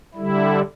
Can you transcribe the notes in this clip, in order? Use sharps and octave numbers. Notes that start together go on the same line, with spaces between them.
D3 G3 E4